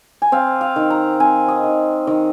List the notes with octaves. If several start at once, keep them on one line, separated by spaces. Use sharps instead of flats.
G#5
C4 F5
F5
D#3
A#5
C4 G#5
D#5
D#3
D#3 D#5